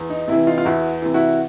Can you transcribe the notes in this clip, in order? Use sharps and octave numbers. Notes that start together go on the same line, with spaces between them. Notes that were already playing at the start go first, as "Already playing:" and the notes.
Already playing: E2
D#4
C3 E3 E4
D#4 F4
F4
E2 E4 F#4
C3 E3
E4 F#4